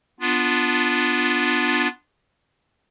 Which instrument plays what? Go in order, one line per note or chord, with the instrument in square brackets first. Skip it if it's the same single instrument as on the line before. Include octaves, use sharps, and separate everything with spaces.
[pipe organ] B3 D4 F4